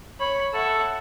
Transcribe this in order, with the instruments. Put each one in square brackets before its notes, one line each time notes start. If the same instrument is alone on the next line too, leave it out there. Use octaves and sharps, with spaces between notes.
[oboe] C#5 [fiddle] B5
[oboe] A4 [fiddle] E5 F#5